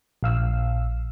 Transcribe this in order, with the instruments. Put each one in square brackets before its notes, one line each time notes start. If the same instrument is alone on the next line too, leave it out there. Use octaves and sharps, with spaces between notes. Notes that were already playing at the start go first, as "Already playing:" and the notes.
[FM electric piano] A#1 F5 E6